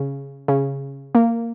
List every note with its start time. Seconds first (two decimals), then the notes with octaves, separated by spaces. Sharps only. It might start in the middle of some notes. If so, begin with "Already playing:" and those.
Already playing: C#3
0.48 C#3
1.15 A#3